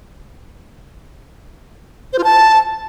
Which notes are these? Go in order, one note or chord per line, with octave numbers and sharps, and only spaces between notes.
C5
F4
A5